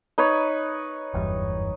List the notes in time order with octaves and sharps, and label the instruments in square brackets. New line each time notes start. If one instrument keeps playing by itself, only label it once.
[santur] D#4 B4 C#5
[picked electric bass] F#1 E2 G2